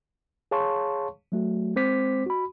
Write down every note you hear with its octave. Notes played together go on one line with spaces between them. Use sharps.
G#4 C#5 F5 A5 C6 C#6
F#3 A3 F#4
G#3 C4 C5 D6 B6
F#4 B5